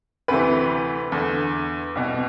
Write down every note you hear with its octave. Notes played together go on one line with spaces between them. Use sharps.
D2 C3 E3 B4
E2 D3
C2 B2